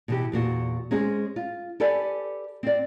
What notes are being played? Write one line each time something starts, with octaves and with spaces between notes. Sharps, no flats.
B2 E3 G4
E2 A#2 F#4
G#3 C4 C#4 G#4
F4
G4 A4 B4 D5 G#5
C4 D5